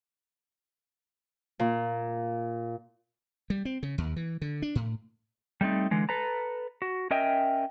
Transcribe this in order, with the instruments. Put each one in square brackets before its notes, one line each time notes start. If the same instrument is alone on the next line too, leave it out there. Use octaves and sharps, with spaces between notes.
[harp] A#2
[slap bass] G3
C4
C#3
D#2
E3
D3
D4
A2
[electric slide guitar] G3 A3 C4 D#4
D3 E3 G#3
A4 B4 A5 A#5
F#4
C#4 A#4 D#5 E5 G5